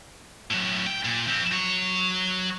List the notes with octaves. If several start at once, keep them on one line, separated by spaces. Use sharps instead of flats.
A2 F#3
G5
A#2
F2 C4
F#3 C#5